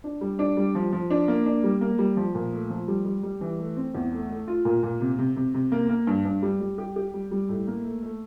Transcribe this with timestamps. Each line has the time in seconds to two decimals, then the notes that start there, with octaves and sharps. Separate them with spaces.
0.04 D4
0.21 G3
0.39 D4
0.57 G3
0.75 F3
0.93 F3
1.10 D4
1.28 A#3
1.46 D4
1.64 G3
1.81 A#3
1.98 G3
2.17 F3
2.35 A#2
2.52 A3
2.70 F3
2.88 G3
3.05 G3
3.23 G3
3.41 E3
3.59 A3
3.77 C4
3.95 E2
4.12 A3
4.30 A3
4.48 F4
4.65 A#2
4.83 A#2
5.00 C3
5.18 C3
5.36 C3
5.54 C3
5.72 A#3
5.89 A#3
6.07 G2
6.25 G2
6.42 G3
6.61 G3
6.78 G4
6.96 G4
7.14 G3
7.31 G3
7.49 A2
7.67 A#3
7.85 A3
8.03 A3